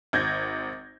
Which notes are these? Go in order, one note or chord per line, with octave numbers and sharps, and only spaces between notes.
G#1 G6 G#6 A#6